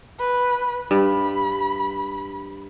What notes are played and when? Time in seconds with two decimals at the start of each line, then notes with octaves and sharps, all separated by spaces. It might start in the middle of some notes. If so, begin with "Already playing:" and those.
0.19 B4
0.91 G2 B5